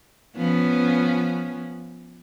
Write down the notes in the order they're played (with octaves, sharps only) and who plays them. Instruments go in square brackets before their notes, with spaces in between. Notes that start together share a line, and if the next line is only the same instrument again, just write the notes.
[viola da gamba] F3 B3 C#4